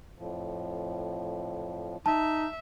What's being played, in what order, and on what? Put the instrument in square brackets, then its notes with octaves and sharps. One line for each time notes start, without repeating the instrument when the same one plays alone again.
[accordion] F2 A2 F3
[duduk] D#4 [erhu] E5 [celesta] A5